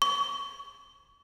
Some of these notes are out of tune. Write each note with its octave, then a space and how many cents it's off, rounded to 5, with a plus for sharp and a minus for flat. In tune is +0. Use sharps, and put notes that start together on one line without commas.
C#6 +35